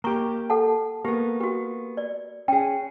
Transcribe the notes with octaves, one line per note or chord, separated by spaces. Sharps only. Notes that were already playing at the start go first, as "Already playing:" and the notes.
A#3 G4 A#5 C#6
A4 F#5 A5
A#3 B3 G4
F#4 G4
D5
C#4 G#4 G5